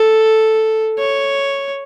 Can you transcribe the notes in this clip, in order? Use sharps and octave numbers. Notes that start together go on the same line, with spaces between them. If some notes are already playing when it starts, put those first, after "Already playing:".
Already playing: A4
C#5